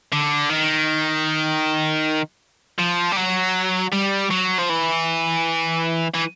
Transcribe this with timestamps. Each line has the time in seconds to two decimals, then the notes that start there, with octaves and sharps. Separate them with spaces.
0.12 D3
0.50 D#3
2.79 F3
3.12 G3
3.17 F#3
3.93 G3
4.31 F#3
4.59 F3
4.70 E3
6.14 E3